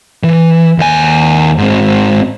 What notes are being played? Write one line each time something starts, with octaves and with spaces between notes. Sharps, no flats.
E3
D#2 G#5
G#2 C4